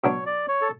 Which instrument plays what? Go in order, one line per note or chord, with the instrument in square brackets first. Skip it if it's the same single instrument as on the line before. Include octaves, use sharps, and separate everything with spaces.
[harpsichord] B2 F#3 B3 D4 [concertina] C#5
[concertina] D5
C#5
A4